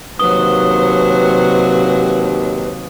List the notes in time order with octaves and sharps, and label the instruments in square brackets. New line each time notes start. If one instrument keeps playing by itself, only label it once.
[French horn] D#2 [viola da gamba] C3 F#3 C5 [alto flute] B4 [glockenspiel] D#6 G7